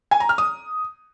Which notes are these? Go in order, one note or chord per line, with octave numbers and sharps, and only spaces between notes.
G#5
A#5
F6
D#6